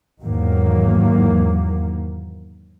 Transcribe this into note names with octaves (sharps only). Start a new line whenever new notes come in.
E2 G#2 D#3 F#3 A#3